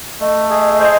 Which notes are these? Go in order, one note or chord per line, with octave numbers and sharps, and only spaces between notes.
A3 D#5
G#4
C5